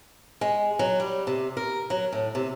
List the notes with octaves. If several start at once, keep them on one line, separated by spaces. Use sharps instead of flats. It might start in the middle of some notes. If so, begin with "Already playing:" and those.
G#3
F#3
G3
C3
A#4
F#3
A2
C3